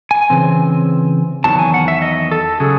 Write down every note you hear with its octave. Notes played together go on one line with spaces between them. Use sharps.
G#5
C#3 E3 C4
E2 D#3 F#3 A5
G#5
F#5
E5
D#5
A4
C#3 F#3 G#4